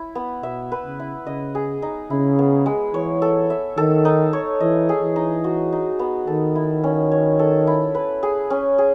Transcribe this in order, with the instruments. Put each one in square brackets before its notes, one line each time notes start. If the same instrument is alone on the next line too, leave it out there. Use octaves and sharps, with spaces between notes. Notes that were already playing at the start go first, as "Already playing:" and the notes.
Already playing: [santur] E4
B3
[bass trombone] B2 [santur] E5
[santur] B4
[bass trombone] C#3
[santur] E4
[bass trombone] C#3 [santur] D#5
[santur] G#4
D#4
[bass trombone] C#3 [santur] E4
[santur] B3
G#3
[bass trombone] E3 [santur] C#5
[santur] A4
E5
[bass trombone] D#3 [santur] A4
[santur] D#4
C#5
[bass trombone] E3 [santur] D#5
[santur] G#4
[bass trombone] E3
[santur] D#4
F#4
D#4
B3
[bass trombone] D#3 [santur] A4
[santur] E4
C#4
C#5
A4
E4
B4
G#4
C#4
G#4